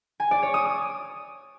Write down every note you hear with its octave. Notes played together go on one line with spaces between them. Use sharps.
G#5
D5
C#5
D#6
D#6